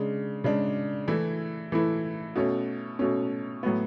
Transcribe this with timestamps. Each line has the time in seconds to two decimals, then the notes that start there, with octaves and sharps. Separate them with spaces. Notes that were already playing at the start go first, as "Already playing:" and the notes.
Already playing: C#3 G#3 D4
0.44 C#3 G#3 D4
1.08 E3 A3 E4
1.72 E3 A3 E4
2.35 B2 A3 C#4
2.99 B2 A3 C#4
3.63 A2 F#3 B3